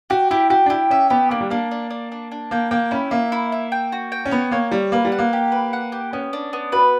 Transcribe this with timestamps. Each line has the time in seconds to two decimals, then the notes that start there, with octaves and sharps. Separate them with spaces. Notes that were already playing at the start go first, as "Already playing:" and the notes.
0.10 F#4 G4
0.31 E4 G4
0.50 F#4 G4
0.66 D4
0.70 E4 G4
0.90 C#4 E5
1.10 B3 G4
1.30 A#3 D4
1.41 G3
1.50 A#3 D4
1.71 D4
1.90 D4
2.12 D4
2.31 D4
2.51 A#3 G5
2.71 A#3 G5
2.91 C#4 E4
3.11 A#3 E5
3.32 E4
3.52 E5
3.72 G5
3.92 F#4
4.12 G5
4.26 C#4
4.31 B3 C#5
4.51 A#3 C#5
4.71 G3 C#5
4.92 A#3 B4
5.05 G3
5.12 F#5
5.19 A#3
5.33 G4
5.52 B4
5.73 F#5
5.92 G4
6.13 B3 C#4
6.33 D4
6.53 B3
6.72 F#4 B4